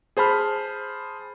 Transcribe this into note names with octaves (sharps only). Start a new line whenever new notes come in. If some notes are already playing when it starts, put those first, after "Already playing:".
G#4 C5 A5 B5 F6